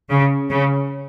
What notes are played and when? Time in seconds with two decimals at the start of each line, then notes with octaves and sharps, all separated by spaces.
0.10 C#3
0.49 C#3